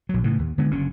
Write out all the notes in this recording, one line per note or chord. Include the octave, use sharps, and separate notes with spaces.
A#1 F#3
A2 C#3 E3
D#2
D3 G#3 B3
F#1 D3 C#4